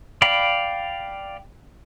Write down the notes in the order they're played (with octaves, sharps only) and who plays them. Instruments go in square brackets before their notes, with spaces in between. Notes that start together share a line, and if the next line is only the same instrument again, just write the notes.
[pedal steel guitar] D5 F5 G5 B5